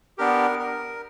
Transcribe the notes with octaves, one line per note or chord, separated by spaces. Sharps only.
B3 D4 G4 A#4
A#4